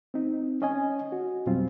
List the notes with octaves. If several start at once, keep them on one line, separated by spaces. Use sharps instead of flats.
C4 D#4
C#4 D#5 G#5
F#4
F2 B2 F#3 G3 C4 F4